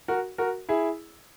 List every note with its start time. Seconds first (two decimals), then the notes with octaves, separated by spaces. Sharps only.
0.08 F#4 A#4
0.38 F#4 A#4
0.69 E4 G#4